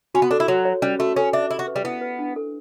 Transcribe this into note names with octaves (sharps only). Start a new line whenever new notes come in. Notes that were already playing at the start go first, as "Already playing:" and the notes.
C#4 F#4
B3
D4 A4
E4
F#3 F#4
C#5
G3 C#4
A3 F#4
C#4 A4
D4 E5
E4 G4
F#4
B4
G3
B3 E4
B4
D4
A4